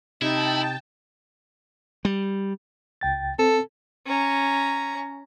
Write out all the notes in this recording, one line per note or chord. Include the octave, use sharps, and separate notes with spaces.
C3 D#4 E4 G5 A5
G3
C#2 G5 A6
C4 A4
C#4 A#5